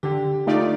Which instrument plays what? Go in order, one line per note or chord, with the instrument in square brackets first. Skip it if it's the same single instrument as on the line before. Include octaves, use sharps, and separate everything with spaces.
[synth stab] D3 [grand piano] G4
[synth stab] A3 D#4 G4 D5 [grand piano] F4